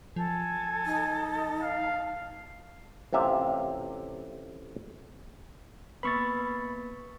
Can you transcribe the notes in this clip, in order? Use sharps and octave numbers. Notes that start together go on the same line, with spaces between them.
F3 A4 G#5
D#4
F5
A1 C3 F4 E5 F5
A#3 B3 B4 B5 C#6 A6